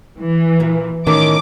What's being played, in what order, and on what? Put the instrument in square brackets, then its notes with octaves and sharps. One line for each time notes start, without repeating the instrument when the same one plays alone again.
[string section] E3
[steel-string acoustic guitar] A#2
[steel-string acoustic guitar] A2 D#3 C#4 [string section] D6